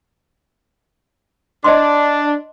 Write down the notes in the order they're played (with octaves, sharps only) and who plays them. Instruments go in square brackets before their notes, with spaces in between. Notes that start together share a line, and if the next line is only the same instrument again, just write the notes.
[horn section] D4 [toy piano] D5 D#5 C6